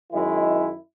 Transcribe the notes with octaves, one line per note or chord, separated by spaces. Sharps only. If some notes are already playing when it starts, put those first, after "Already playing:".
F#2 D#3 G#3 E4